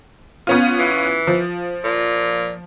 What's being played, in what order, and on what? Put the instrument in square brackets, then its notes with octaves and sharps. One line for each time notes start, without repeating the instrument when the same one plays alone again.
[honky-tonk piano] B3 C#4 F4
[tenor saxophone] E3
[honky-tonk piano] F3
[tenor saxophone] A#2